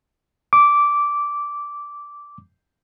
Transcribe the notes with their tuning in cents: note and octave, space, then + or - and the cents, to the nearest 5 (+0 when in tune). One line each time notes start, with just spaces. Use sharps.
D6 -10